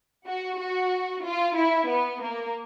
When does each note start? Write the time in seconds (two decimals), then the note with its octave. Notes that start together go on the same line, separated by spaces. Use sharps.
0.27 F#4
0.59 F#4
1.24 F4
1.56 E4
1.88 B3
2.21 A#3